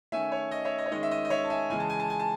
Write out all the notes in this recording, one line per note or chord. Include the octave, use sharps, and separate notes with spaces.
D#3 A3 C#4 E5 G#5
C#5
D#5
C#5 E5
D#5
C#5
D#3 G#3 C#4 D#5
E5
D#5
D#5
C#5 E5
A5
E5 G#5
C#3 E3 G#3 G#5
A5
G#5
A5
G#5
A5